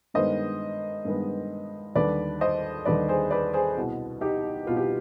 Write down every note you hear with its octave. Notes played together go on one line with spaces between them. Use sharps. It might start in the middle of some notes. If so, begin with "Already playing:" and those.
G2 D#3 G#3 B3 C5 D#5
G2 D#3 G#3 B3
D#2 D3 G3 B4 D5
C5 D#5
D#2 D3 G3 B4 D5
G#4 C5
B4 D5
G#4 C5
C2 B2 B3
D#4 G4
C2 B2 B3 F4
G4